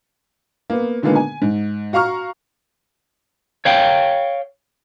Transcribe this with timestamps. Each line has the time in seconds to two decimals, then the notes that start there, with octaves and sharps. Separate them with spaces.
0.70 A#3 B3
1.02 A#2 D3 D#3 G#3 A#3 B3
1.15 G#5
1.42 G#2
1.93 F#4 F5 A#5 C#6 F6
3.65 C#5 F5 G5